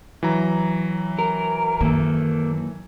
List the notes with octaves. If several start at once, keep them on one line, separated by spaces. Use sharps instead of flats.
E3 F#3 A#5
A#4
F#2 D#3 A#3 A4